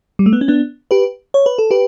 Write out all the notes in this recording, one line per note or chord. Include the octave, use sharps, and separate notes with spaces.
G3
A3
B3
C#4
B3 D4
G4 B4
C#5
B4
A4
G4 B4